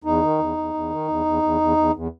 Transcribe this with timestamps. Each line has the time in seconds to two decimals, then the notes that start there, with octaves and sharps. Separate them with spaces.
0.04 E2 D#4
0.22 D#3
0.39 E2
0.57 E2
0.74 E2
0.90 D#3
1.08 E2
1.25 E2
1.42 E2
1.61 E2
1.77 E2
1.94 E2